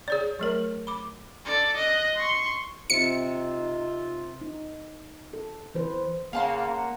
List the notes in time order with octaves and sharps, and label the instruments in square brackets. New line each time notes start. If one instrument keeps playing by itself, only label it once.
[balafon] G#4 C#5 D5
F#3 A3 A#4
B5 D6
[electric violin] A4 D5
D#5 F#6
C6 C#6
[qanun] C3 [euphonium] D#4 [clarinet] F4 [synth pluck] C#7
[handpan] D#4
A4
E3 B4 C5
[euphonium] C#3 [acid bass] A#3 [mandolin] F5 A5 C6 [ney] F#5